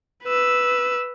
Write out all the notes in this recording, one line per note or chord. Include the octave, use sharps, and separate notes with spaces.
B4 E6